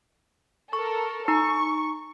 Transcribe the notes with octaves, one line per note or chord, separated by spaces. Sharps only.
A4 A#4 C#6
D#4 A#5 C#6